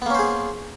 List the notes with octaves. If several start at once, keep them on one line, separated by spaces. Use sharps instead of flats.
A#3 B3 C#4 G#4 C5